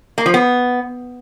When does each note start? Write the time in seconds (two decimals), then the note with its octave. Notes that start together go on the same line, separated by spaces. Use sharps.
0.18 A#3
0.26 F3
0.34 B3